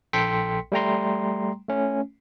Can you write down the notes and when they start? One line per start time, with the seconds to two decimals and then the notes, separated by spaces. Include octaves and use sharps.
0.13 A#1 A4 G5 C6 B6 C#7
0.72 G3 A3 G5 A#5 C6
1.68 A3 C#4